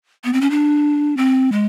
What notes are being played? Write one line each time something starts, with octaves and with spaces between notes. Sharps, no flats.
B3
C4
C#4
D4
C4
G#3